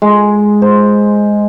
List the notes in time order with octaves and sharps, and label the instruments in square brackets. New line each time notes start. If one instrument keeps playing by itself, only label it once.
[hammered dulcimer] G#3
C5